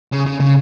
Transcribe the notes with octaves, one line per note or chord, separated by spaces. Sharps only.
C#3
C#3
C#3